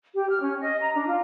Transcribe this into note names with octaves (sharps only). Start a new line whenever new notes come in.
G4
F6
C#4
D#5
A#5
D4
F4